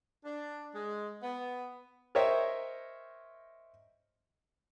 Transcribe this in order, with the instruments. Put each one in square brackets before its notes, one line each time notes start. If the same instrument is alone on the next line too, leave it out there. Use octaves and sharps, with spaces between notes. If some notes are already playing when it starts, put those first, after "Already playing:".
[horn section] D4
G#3
B3
[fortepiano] A#4 C5 C#5 D#5 E5 G5